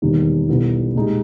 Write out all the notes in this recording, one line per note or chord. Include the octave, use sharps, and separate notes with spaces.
E1 D#2 D#3 G3
B1 B2 G3 B3 E4
A#2 G#3 D#4 G4